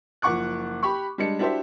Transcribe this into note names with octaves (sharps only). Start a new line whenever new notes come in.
F#1 F3 F#5 C#6 D6 F#6
G4 B5 C#6
G3 G#3 D4 C#7
D4 E4 F#4 G4 C5 E5